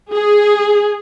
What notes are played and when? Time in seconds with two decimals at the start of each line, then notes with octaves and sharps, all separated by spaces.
0.12 G#4